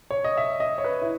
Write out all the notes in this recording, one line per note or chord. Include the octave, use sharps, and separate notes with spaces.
C#5
D#5
E5
D#5
C#5
B4
E4